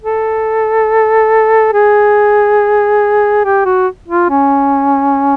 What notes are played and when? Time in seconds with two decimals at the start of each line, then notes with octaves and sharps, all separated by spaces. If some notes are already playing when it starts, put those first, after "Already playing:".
0.02 A4
1.73 G#4
3.44 G4
3.65 F#4
4.08 F4
4.30 C#4